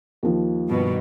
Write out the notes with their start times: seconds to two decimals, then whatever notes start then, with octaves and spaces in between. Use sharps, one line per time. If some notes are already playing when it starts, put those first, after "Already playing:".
0.23 D#2 F3
0.69 G2 B2 D#3